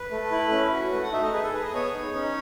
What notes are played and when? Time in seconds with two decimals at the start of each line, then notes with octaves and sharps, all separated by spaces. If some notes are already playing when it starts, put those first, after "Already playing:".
Already playing: B4
0.11 A3
0.31 E4
0.52 C#4
0.72 F#4
0.92 A3 B4
1.03 F#5
1.12 D#4 E5
1.23 D#5
1.33 G#4 B4
1.43 A4
1.53 G#4 B4
1.63 D#5
1.74 B3 C#5
1.94 D#4
2.15 C#4